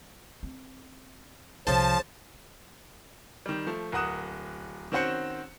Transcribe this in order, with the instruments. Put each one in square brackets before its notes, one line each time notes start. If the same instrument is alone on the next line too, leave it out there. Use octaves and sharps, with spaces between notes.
[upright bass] C4
[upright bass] C2 C3 [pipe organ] F3 [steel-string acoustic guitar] C#4 G#4 C5 [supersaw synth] A5
[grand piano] D#3 G3
F3 A3
D1 A#4 F#5 D#6 F#6 E7
D#3 C4 C#4 F#4 C5 C#7